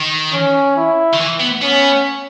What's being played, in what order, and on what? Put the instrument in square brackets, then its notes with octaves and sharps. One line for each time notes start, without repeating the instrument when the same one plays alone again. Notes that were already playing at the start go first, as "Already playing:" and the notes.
Already playing: [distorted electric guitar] D#3
[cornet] C#4
E4
[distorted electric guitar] D#3
E3
B3
[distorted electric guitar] B3 [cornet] C#4